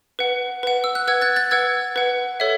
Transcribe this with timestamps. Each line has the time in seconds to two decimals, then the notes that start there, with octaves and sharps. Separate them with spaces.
0.19 B4 F#5
0.63 B4 F#5
0.84 E6
0.95 F#6
1.07 B4 F#5 E6 G#6
1.21 F#6 A6
1.36 F#6 A6
1.51 B4 F#5 E6 G#6
1.96 B4 F#5
2.40 A4 C#5 E5